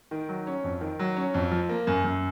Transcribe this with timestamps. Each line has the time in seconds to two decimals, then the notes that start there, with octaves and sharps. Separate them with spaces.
0.11 D#3
0.29 F#3
0.47 C#4
0.64 F2
0.81 D#3
0.99 F#3
1.17 C#4
1.34 F2
1.52 F3
1.69 A#3
1.87 F#2
2.04 F#2